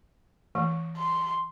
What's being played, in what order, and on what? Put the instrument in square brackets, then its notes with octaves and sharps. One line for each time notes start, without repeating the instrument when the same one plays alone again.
[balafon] E3 A3
[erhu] C6